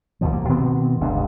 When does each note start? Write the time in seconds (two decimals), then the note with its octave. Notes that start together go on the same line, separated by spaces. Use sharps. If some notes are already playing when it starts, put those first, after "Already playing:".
0.21 D#2 B2 F3
0.33 C2 A#3
0.49 B2 D#3 B3 C4
1.00 F1 C#2 G2 D4